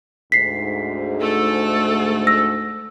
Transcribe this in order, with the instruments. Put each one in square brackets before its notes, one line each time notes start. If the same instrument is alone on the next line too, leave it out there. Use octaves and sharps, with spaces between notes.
[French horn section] D2 G#2 [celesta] B6 C7
[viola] A3 A4
[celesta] E6 A#6